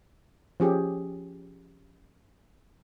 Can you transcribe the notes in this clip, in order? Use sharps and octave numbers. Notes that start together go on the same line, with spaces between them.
F3 C#4 G4 G#4